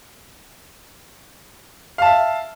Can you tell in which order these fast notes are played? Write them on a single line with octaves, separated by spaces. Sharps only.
F5 A5 E5